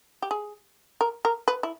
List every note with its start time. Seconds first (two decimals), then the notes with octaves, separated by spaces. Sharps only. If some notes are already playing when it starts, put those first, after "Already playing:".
0.22 G4
0.31 G#4
1.01 A#4
1.25 A#4
1.48 B4
1.63 E4